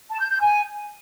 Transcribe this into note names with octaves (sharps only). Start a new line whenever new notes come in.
A5
G6
G6
G#5